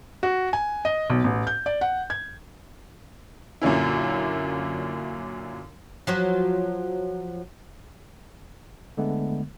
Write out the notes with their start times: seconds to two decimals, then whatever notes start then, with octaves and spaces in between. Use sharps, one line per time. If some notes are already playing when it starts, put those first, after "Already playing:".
0.23 F#4
0.53 G#5
0.85 D#5
1.10 B1
1.24 A1
1.47 G6
1.66 D5
1.81 F#5
2.10 G#6
3.62 F#2 A#2 D3 C#4 E4
6.07 F3 F#3 F#4
8.97 D3 G#3 A3 B3